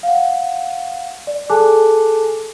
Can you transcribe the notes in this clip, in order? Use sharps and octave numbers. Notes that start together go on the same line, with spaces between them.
F5 F#5
D5
G#4 A4 G#5 A5 D6 F#6